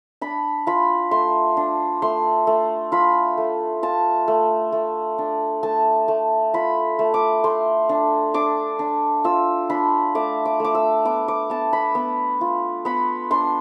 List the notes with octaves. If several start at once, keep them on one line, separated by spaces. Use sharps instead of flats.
D4 B5
F4 B5
A3 C6
D4
A3 C6
A3
F4 B5
A3
F4 A5
A3
A3
D4
A3 A5
A3
F4 B5
A3
D6
A3 C6
D4
D4 D6
D4
F4 E6
D4 B5
A3 D6
D6
A3 D6
E6
B3 D6
D6
B3 A5
B5
B3
F4
B3 B5
D4 C6